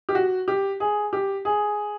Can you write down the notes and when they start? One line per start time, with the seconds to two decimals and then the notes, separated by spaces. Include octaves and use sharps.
0.09 G4
0.15 F#4
0.48 G4
0.80 G#4
1.13 G4
1.45 G#4